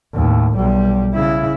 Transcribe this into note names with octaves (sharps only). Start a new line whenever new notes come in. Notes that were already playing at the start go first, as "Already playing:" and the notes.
D#2 A2
B1 G3
C#3 E4